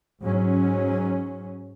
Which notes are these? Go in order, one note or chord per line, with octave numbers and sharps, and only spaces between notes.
G#2 F#3 C#4